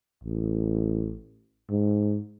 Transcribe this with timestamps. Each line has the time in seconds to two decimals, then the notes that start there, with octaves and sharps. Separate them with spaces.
0.24 A1
1.70 G#2